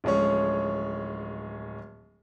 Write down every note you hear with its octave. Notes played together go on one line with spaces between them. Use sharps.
D1 F3 G#3 C#4 C#5